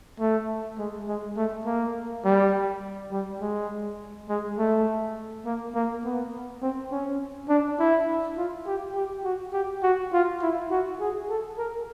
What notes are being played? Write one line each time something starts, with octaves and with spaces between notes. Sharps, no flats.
A3
G#3
G#3
A3
A#3
G3
G3
G#3
G#3
A3
A#3
A#3
B3
C4
C#4
D4
E4
F4
G4
G4
F#4
G4
F#4
F4
E4
F#4
G#4
A4
A#4